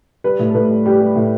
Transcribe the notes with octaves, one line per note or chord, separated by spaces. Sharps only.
G3 B4
A2
A4
A2 B4
G3
G3 G4
G3
A2